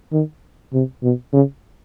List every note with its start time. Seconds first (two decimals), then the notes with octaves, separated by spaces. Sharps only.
0.13 D#3
0.73 C3
1.03 B2
1.33 C#3